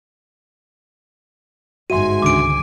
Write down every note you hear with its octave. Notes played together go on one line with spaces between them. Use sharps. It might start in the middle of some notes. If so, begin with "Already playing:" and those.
G1 G#2 F#4 E5 G#5 C6 D#7
C#2 D3 D#3 D6 D7